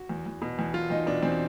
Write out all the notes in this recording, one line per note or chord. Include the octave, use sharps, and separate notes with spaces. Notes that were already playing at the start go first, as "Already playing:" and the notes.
Already playing: F#4
E2
E2
B2
E2
E2 F4
E2 D#4
B2 D4
E2 C4